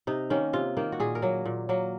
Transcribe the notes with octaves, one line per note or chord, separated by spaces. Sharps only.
C3 D#4
D#3 A#3 C#4
C3 F4
D#3 A#3
F#4
A#2 G#4
A#4
F#3 A#3
A#2
F#3 A#3